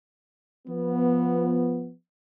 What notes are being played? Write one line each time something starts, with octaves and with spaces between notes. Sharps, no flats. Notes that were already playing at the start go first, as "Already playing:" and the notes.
F3 B3